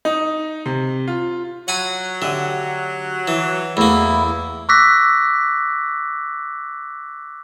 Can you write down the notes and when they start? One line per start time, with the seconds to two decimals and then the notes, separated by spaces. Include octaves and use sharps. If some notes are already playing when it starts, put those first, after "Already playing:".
0.05 D#4
0.66 C3
1.08 F4
1.68 F#3 F#5 G#5 B5
2.22 D3 G4 D#5 E5
3.28 E3
3.77 E2 A3 A#3 E4
4.69 C#6 D6 E6 F#6 A#6 B6